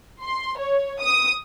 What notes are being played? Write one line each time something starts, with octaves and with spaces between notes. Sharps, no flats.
C6
C#5
D#6